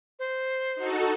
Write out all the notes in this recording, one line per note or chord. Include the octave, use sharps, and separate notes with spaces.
C5
D#4 F#4 A4